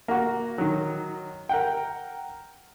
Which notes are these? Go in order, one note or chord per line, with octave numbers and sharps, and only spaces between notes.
A#3 F#4
D#3 F#3
A#4 F#5 G5